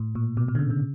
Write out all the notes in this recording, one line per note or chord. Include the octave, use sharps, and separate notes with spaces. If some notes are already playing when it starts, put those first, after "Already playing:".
Already playing: A2
A#2
B2
B2
D3
C#3
C#3